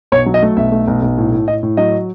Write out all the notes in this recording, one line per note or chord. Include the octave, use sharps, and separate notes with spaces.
B1 C#5
F#3
D#5
A3
B1 E5
A3
B1
B1
A2
A2
A2 D#5
A2
F#3 D#5